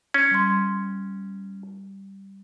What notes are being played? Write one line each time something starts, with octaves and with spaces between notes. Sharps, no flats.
C#4
G3 C6